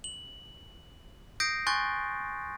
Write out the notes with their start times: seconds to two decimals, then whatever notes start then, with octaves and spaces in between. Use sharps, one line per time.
0.04 F#7
1.40 D#6 G6 A#6 C7 D7
1.67 G#5 C6 C#6 F#6 G6 A6